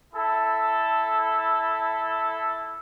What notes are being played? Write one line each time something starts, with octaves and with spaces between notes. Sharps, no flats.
E4 A4